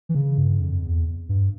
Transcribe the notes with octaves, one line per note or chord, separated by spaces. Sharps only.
E3
C#3
G2
F2
E2
G2